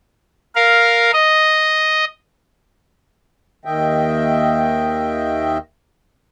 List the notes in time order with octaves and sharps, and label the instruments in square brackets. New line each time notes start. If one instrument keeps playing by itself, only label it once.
[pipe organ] A#4 F5
D#5
[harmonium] D#2 D#3 D#5 E5 G5